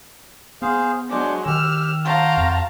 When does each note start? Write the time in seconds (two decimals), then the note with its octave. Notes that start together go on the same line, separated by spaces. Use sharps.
0.62 B3 G#4 C5 F5
1.11 F#3 G#3 D4 C5 D6
1.46 D#3 G4 E6 F6
2.05 F#4 F5 G5 A5 A#5 C6
2.37 F2